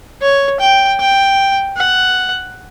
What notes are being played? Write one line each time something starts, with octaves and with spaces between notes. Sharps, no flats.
C#5
G5
G5
F#5